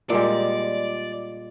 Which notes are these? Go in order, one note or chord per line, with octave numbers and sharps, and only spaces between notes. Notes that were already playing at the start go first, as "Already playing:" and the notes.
A#2 G3 G#3 D5